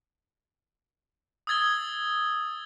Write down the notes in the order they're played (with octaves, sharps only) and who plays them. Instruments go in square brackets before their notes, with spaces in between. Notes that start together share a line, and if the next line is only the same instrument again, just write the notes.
[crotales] D#6 E6 G#6 A6 G7